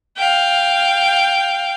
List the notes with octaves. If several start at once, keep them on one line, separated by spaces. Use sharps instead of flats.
F5 G5